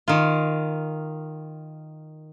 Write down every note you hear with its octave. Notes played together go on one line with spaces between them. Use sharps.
D#3 F4